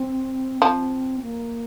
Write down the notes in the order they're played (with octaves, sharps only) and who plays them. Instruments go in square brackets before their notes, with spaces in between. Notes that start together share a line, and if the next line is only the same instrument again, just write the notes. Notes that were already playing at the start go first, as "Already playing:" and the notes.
Already playing: [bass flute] C4
[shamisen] F3 [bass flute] C4
[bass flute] A#3